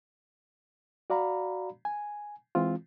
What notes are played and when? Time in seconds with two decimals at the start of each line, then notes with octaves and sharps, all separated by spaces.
1.10 F#4 D5 F5 A#5 B5
1.85 G#5
2.55 E3 G#3 C4 F4